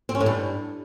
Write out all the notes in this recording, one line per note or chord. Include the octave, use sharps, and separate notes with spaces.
C4
C#4
A2
G2